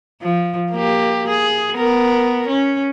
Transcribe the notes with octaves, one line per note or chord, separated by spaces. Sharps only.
F3
A#3 G4
G#4
B3 A#4
C#4